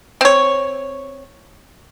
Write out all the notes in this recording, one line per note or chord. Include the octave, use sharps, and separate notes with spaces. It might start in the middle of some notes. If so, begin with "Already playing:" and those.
C4 C#5